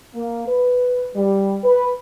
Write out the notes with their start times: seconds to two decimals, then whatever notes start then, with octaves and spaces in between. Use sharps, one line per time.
0.15 A#3
0.48 B4
1.15 G3
1.64 B4